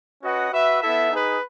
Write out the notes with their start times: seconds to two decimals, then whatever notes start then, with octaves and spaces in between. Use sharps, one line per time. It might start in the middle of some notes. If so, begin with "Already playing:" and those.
0.23 C#4 F#4 B4 D#5 F#5
0.52 F#4 B4 E5
0.81 B3 E4 A4 E5
1.11 D#4 G#4 B4